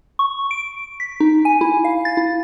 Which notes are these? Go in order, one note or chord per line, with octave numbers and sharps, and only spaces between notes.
C#6
D7
B6
D#4
G#5
E4
F5
A6
E4